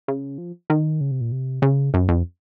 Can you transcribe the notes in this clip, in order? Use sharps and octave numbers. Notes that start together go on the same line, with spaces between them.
C#3
F3
D#3
C#3
C3
A#2
C3
C#3
F#2
F2